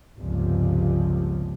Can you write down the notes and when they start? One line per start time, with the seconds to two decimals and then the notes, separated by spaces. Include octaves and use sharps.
0.18 G1 C#2 C3 F3